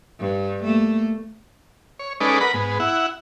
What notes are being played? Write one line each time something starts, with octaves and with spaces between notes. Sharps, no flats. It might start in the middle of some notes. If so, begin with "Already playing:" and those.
G2
A3 A#3
C#5
G#3 C#4 D#4 A4 B4 D5
A#4 B4 F#5 B5
G#2 B3
E4 F#5